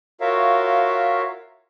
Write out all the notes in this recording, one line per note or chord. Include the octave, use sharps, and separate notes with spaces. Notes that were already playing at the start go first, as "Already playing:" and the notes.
F4 F#4 A#4 C#5 E5 F5